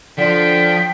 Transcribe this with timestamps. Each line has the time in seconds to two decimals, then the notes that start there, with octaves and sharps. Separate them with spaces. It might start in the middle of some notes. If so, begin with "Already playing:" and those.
0.18 D3 F3 G5 B6